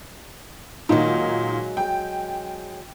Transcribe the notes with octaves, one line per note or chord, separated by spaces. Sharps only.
A#2 D#3 F#3 G#3 D#4
G5